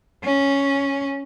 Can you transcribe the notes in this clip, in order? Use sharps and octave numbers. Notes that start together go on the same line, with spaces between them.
C#4